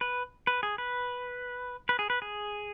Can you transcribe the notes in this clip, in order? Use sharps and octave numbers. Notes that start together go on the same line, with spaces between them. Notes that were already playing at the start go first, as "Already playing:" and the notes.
B4
B4
G#4
B4
B4
G#4
B4
G#4